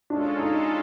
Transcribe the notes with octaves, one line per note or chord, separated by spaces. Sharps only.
G#3 C#4 D4 F4 A4
D#4